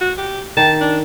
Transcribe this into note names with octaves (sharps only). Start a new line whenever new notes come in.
F#4
G4
D#3 A5
D4